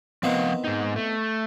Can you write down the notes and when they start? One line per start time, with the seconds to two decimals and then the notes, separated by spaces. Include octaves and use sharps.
0.23 D#3 F3 B3 C4 F5 F#5
0.64 G#2 D#4
0.96 A3